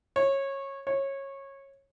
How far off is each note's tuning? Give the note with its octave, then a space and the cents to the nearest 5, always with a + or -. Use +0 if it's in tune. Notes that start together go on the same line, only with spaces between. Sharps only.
C#5 -20
C#5 -20